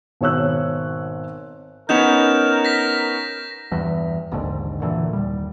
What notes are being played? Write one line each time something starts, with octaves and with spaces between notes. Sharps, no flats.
G#1 B2 C#5 E6 F#6
B3 C#4 D#4 A#4 G6 E7 F7
A#6 B6
E2 G2
A#1 D#2 G#2 D3
F#2 A#2 D3 E3
D#1 G3